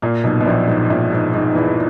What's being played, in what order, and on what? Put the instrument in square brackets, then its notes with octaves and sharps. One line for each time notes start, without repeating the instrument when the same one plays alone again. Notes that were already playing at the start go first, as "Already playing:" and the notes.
[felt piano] A#2 A#3
B1 B2
B2
A#1 A#2
G#2
A#1 A#2
G#2
G#2
E2 E3